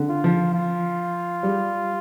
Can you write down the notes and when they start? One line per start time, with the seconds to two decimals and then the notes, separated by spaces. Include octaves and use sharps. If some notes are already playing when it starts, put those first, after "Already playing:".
Already playing: D3
0.09 F4
0.24 F3
0.54 F4
1.43 G3